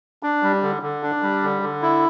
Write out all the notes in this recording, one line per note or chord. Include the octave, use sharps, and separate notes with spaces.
D4
G3
D3
D3
D4
G3
D3
D3
E4